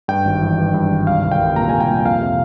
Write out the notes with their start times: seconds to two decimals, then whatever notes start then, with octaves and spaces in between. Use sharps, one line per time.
0.08 G2 G5
0.25 G#1
0.41 E3
0.58 G2
0.74 G2
0.90 G#1
1.07 C2 F5
1.23 C2
1.32 G5
1.40 C2
1.56 A#2 A#5
1.69 C2 G#5
1.80 G5
1.88 A#2
2.05 F2 F5
2.21 C3